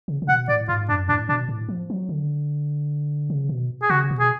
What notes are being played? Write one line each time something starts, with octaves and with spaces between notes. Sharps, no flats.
C#3
C#3
B2 F#5
A2 D5
G#2 F4
F#2 D4
A2 D4
B2 D4
A2
F3
F#3
D3
C#3
B2
G#4
C#3 F#4
B2
G#4